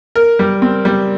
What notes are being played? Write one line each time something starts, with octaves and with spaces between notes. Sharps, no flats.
A#4
G3
C4
G3